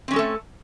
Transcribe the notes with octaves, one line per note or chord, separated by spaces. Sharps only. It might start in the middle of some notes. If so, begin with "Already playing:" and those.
G#3 A3 C4 C#4 A4